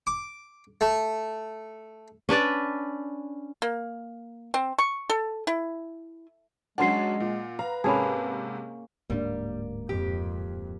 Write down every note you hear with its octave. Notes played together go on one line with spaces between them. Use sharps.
D6
A3
C#4 D4 B4 D5
A#3
C4
C#6
A4
E4
F#3 G#3 C#4 D4 F#5 C6 C7
A#2
B4 F5 A#5
G#2 C3 A#3 C#4 G#4 A5 B5
D1 G#2 G3 A#3 D4
F2 G4